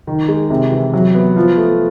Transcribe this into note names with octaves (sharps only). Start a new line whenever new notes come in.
D#3
G#3
C3
E3
F#3
B3
F3
A3